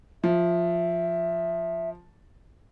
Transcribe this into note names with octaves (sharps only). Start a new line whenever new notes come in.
F3 E5